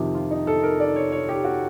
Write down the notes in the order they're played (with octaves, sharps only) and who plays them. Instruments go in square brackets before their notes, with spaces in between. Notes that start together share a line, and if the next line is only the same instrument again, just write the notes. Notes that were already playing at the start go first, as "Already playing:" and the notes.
Already playing: [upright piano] F2 C3 D#3 G4
F4
D#4
A4
A#4
D5
C#5
C#5
G4
F#4